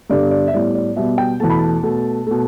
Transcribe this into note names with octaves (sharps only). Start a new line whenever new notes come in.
G2 D3 G3 B3 D5
D5
E5
A2 G3 B3 D5
D5
B2 G3 B3 E5
G5
E2 B2 A3 A5
B5
A5
B2 A3
B2 A3